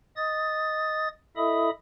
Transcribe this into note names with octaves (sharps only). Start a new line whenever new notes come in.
D#5 D#6 A6
E4 A4 D#5 E5 B5 D#6